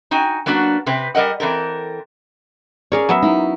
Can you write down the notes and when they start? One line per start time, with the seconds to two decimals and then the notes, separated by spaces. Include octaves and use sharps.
0.11 D#4 F#4 G5 G#5
0.46 F#3 A#3 B3 D4 F#4
0.86 C3 C4 B4
1.15 G3 A#4 D#5 F#5
1.40 E3 C4 A4 A#4
2.92 C#4 G#4 A#4 C#5 D5
3.09 F#3 B3 E5
3.22 D#4 E4